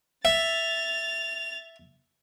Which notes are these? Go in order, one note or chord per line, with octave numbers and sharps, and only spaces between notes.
E5 A6 F7